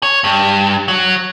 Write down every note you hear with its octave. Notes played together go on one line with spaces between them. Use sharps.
C#5
G2
F#3